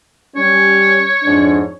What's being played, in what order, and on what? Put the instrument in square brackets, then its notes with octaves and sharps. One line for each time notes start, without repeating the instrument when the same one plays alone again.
[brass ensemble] G3 C#4 [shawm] C#5
[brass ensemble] F2 G#2 D4